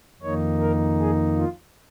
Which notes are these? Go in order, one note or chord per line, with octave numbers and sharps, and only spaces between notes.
F2 D#3 A#3 D#4 C#5
A#4
G#4
F4